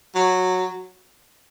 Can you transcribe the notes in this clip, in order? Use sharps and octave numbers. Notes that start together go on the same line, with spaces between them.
F#3